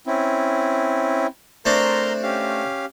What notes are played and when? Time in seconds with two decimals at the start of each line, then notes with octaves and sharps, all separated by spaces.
0.07 C4 C#4 E4
1.66 A3 C4 D4 A#4 A#5 C6
2.23 C#4 G4 F5